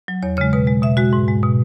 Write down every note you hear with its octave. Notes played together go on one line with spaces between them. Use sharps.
F#3
E2 C#5
C#3 G#3 C#5
B2 B4
G#3
B2 E5
G#3 F#4
G#2
G#3
B2